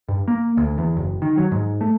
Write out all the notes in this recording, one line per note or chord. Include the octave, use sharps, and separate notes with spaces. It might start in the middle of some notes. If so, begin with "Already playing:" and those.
G2
A#3
D2
E2
F#1
D#3
F#3
G#2
A3